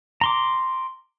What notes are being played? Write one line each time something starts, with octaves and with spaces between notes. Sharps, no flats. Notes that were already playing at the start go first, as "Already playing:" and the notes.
A#5 C6 D6